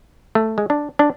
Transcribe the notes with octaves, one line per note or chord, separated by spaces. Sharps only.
A3
G#3
D4
D4